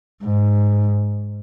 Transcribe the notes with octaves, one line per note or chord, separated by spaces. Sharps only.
G#2